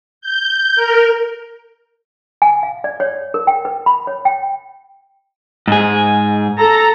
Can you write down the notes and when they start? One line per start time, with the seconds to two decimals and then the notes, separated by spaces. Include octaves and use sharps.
0.21 G6
0.76 A#4
2.42 G#5
2.63 F5
2.84 D5
3.00 C#5
3.34 A#4
3.47 G5
3.65 B4
3.86 B5
4.07 C#5
4.25 G5
5.68 G#2 G#4
6.59 A4 A#5